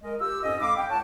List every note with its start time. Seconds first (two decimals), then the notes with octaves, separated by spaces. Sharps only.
0.03 G#3 A#4 D#5
0.20 F4 G4 E6
0.43 F2 G#2 C#4 A4 D#5
0.60 F2 G#3 F5 B5 D6
0.77 G5
0.90 C#2 C#5 F#5 G5 A5